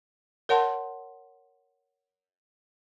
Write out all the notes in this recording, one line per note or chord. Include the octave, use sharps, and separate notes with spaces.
A#4 C#5 F#5 A5 C6